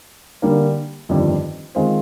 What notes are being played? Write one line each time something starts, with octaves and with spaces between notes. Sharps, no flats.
D3 G3 A#3
G1 F2 D#3 G3 D4
D#3 G#3 C4 F4 C5